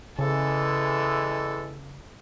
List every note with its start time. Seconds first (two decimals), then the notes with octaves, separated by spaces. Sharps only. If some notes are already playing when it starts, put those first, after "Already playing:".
0.19 E2 C#3 E3 G#3 A4